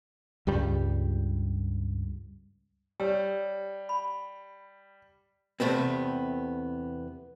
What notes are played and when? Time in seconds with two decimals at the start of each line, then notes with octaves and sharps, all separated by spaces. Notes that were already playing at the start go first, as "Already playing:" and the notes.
0.47 C#2 G2 G3
3.00 G3 G4 C#5 E6
3.89 B5
5.60 E2 C3 A3 B3 C4